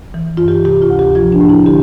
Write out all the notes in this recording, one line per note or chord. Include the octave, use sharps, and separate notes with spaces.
E3
G2 F4
G4
C3 G4
F4
D2
G4
F3 F4
D4
A2
E4
D3 G4